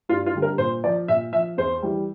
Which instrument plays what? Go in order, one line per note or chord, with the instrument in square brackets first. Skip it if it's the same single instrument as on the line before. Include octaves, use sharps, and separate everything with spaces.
[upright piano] G2 F4
F4
D3 G3
A#4
A#2 C5
F3 D5
A#2 E5
F3 E5
E2 C5
E3 G3